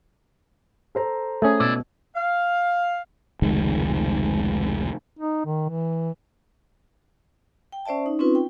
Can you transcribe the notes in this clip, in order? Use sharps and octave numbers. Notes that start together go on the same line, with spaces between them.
A4 C5 A#5
A3 C#4 G#4
B2 E4 D5 E5
F5
F1 C#2 D#3 G#3
D#4
D#3
E3
G5
C#4 C5 D5 E5 A5
D#4
C4 C#4 D#4 F4 B4
G5